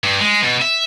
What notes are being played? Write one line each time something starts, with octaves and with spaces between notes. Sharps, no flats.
G2
G#3
B2
E5